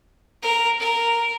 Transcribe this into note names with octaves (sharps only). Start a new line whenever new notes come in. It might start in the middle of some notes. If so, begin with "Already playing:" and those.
A#4
A#4